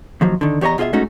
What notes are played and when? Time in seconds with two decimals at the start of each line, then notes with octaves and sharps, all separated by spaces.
0.21 D#2 F3 F#3
0.41 D3 D#3
0.61 E2 G4 C#5 D#5 A#5
0.78 B2 F4 G#4 D#5 E5
0.93 G#2 A3 C#4 D#4 F#4